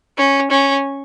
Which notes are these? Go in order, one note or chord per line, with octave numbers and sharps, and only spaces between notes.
C#4
C#4